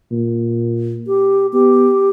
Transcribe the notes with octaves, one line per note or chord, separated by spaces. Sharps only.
A#2
G4
B3 G4